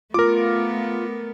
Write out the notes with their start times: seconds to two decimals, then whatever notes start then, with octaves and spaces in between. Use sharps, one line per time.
0.14 A3 B3 F4 A#4 D6